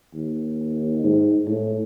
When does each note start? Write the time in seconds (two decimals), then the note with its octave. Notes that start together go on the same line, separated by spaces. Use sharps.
0.14 D#2
1.04 G#2
1.47 A2